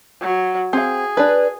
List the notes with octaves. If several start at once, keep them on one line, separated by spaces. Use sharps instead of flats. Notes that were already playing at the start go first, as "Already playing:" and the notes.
F#3
C4 G#4 F5
D4 B4